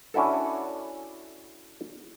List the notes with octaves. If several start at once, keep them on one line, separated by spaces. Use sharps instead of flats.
C#4 D4 E4 F#4 A4